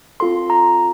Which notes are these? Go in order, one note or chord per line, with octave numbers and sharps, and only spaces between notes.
C4 F4 A4 C6
A#5